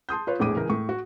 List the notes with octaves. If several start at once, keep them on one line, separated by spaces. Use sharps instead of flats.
A5 C6 D#6 G6
F4 B4 C#5
A#1 E2 A2 G#4 D6 D#7
C#2 E3 A#4
A2 C#6
F#4